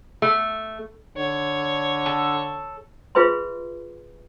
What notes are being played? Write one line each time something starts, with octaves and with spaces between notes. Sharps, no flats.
A3
D3 C#5
A4
F4 G#4 B4 E5 C6